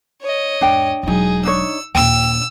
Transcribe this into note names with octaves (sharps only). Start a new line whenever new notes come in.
C#5 D#5
E2 G#2 D4 G5
E1 F#3 D#4 G#4
D4 D#4 C#5 E6
D#2 A#2 G5 E6